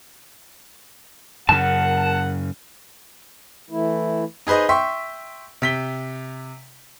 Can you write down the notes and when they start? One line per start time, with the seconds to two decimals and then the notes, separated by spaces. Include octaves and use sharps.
1.49 F#2 C#3 A#4 F#5 A5
3.70 E3 A3 E4
4.47 D#4 G#4 B4 C5 D#5
4.69 E5 G5 C6 C#6 B6
5.62 C3 B6 G7